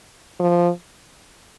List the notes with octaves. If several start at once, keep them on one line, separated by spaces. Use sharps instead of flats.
F3